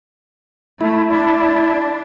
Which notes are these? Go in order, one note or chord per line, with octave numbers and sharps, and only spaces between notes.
A3 E4
D4